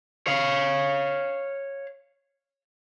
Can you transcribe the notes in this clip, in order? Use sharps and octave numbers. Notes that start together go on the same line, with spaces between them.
C#5 F5